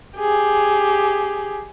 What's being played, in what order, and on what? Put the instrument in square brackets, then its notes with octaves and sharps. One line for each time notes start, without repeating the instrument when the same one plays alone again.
[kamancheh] G4 G#4